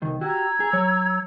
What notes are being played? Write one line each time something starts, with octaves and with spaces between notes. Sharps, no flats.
C2 D#3
F#4 G4 A#5 E6 G#6
G#4
F#3 C#5